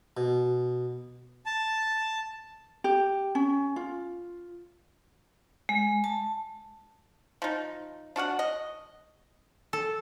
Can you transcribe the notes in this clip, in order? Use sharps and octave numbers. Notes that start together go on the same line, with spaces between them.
B2
A5
G4
C#4
F4
G#3
A5
F3 D#4
D4 F#4 F5 F#5
D#5
A4